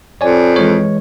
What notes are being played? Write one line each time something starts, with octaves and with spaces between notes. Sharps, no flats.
F2 C#5 D5 G#5
E3 G#3 C#5